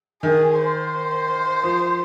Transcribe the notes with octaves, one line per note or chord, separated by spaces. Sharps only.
D#3 G#4
C5
F3